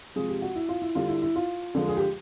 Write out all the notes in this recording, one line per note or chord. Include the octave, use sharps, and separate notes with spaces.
C3 F3 G#3 G#4
G4
F#4
E4
F4
E4
D3 G3 F4
E4
E4
F4
D3 F3 G#3
G#4
G4